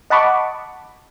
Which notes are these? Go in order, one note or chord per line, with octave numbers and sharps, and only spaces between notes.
D#5 F#5 A5 B5 C#6 D6